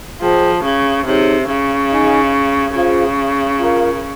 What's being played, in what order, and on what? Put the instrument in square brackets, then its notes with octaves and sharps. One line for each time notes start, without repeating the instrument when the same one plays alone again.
[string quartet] F3 [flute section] G#4 C5 G5
[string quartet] C#3
[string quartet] C3 [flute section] D#4 G#4 C#5
[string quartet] C#3
[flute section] D#4 G#4 D#5 G#5
[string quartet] C#3 [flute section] F4 G#4 C5 F5
[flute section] F4 A#4 F5 A#5